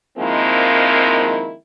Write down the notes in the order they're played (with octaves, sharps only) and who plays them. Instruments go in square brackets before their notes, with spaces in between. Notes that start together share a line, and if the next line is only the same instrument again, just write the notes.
[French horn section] D#3 F3 G#3 A#3 C4 E4